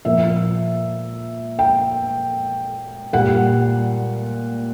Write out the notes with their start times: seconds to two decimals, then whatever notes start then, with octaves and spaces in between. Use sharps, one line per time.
0.05 A#2 F3 A#3 E5
1.59 G5
3.13 A#2 G3 A#3 F#5